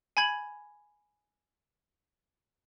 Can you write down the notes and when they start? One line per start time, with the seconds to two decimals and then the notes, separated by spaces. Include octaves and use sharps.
0.17 G#5 B5 G#6 F#7